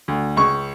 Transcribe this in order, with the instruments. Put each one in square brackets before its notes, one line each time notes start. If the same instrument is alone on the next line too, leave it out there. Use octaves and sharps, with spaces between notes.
[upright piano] D2
C#2 C#6